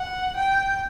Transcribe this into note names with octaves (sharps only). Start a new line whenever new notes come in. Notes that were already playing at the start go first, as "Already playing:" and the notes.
Already playing: F#5
G5